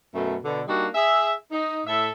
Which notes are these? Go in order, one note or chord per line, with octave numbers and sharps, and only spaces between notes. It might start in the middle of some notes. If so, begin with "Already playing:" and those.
F#2 B2 A3
B2 D3
G3 A#3 D4 D#4 F#4
G#4 E5
D#4
A2 A4 E5